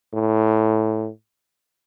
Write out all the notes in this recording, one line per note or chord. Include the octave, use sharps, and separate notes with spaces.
A2